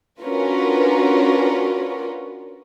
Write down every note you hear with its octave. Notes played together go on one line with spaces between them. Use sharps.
C#4 D4 F4 F#4 A#4 B4